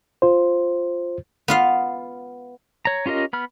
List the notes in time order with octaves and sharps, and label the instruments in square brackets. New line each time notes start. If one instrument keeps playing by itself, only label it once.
[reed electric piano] F4 C5
[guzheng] B3 F4 F5
[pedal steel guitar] C#5 A#5
C#4 F4 G4 A#4 D#5
B3 B5 F6